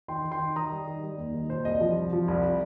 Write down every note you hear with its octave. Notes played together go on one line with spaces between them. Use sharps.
D#3 G5 C6
D#3
G5 C6
D#3
D#3 A#5 D#6
G3
D#3
G3
D#2
D#3
A#2 C5
C2 D#5
F3
C2
F3
C2